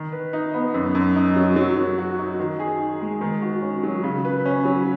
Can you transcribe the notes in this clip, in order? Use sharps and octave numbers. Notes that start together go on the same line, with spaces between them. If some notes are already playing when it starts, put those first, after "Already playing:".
Already playing: D#3
B4
D#4
B3
F#2
F#2
D#4
F#3
F#3
F#3
F#4
D#4
D#3
G#4
D#4
G#3
D#3
F#4
C#4
F#3
C#3
B4
C#4
F#3